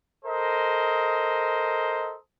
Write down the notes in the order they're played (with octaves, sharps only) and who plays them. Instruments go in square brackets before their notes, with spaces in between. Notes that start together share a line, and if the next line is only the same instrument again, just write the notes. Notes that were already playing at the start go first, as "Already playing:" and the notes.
[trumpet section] A4 A#4 C5 D#5